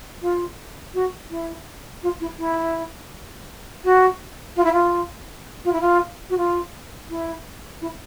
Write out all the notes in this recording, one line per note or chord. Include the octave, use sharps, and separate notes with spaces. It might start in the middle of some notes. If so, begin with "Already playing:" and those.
F4
F#4
E4
F4
E4
E4
F#4
F4
E4
F4
F4
E4
F4
F#4
F4
E4
E4